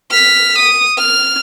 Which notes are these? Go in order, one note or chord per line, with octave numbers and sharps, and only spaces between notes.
F6 B6
D#6
F6